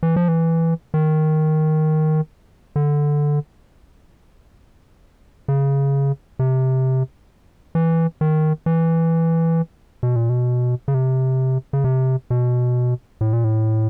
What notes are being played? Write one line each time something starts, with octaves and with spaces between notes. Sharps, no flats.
E3
F3
E3
D#3
D3
C#3
C3
E3
D#3
E3
B2
A#2
B2
C#3
C3
C#3
C3
B2
A2
A#2
A2